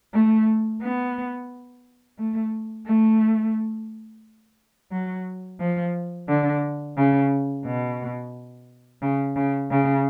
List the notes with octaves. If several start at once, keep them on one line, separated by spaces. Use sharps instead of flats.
A3
B3
A3
A3
F#3
F3
D3
C#3
B2
C#3
C#3
C#3